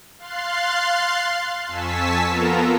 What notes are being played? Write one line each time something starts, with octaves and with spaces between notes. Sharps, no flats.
F5 C6 F#6 A6 C7
F2 G#5 A5 C#6 E6 B6
B3 F4 A4 A#4 A#5